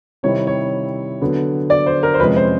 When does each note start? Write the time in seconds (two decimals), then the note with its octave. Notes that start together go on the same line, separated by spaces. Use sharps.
0.23 C3 D#3 G3 C4 E4 C#5
0.47 C#5
1.22 D3 F#3 B3
1.70 D5
1.86 C5
2.03 A#4
2.14 C5
2.20 F2 C3 F3 G#3 C#4 B4
2.36 C5